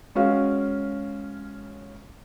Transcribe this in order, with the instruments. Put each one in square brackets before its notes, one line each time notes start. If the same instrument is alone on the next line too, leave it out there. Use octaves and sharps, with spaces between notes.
[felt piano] G#3 C#4 F#4 F5